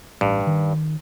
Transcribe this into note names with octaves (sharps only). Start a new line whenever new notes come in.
A1 G2
D#3